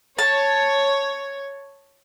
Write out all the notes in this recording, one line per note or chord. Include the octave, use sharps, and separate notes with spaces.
C#5 A5